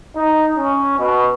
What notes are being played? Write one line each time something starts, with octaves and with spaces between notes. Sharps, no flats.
D#4
C#4
B2